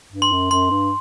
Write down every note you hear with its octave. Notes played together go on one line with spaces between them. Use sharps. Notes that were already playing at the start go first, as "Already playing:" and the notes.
G2
C6
F#2
F#2 C6
G2